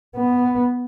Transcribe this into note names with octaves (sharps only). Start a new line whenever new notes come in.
B3